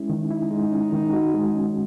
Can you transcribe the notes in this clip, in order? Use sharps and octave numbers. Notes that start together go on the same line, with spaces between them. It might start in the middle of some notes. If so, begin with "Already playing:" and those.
Already playing: G#3 C#4 E4
D#3
D#4 E4
G#3
C#4
D#3
F#4
G#3
C#4